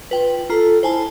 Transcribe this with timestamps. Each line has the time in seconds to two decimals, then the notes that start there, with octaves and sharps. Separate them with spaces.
0.11 F4 B4 G5
0.50 F4 A4 A#5
0.83 E4 C5 G#5 A5